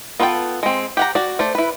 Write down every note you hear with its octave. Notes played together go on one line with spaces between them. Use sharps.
B3 F4 A4 C5 G5
G#3 C4
G4 F#5 A#5
F#4 D5
A3 C5 D5
E4 B4